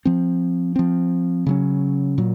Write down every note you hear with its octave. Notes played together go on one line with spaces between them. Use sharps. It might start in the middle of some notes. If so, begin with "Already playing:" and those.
F3 C4
F3 C4
C#3 F#3 C#4
A#2 F#3